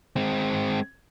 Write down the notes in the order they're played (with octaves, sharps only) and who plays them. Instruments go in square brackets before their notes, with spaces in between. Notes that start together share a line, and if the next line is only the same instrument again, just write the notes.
[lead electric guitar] G#3 C4